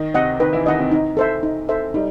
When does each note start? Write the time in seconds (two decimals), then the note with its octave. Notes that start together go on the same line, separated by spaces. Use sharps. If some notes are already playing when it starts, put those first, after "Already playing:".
Already playing: D#3 D#4
0.14 C3 C4 D#5 F#5
0.40 D#3 D#4 B4
0.53 E3 E4
0.66 D#3 D#4 D#5 F#5
0.78 C3 C4
0.92 D#4
1.17 A4 C5 E5
1.43 D#4
1.69 A4 C5 E5
1.94 G3 D#4